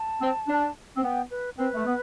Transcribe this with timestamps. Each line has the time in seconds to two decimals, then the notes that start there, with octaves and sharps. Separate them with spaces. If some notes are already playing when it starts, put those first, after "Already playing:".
Already playing: A5
0.21 C4
0.48 D4
0.96 C4
1.02 B3 G5
1.31 B4
1.58 C4 B4
1.74 A3
1.86 B3